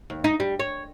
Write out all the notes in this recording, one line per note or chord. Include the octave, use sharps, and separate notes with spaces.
D#2
D#4
G3
C#5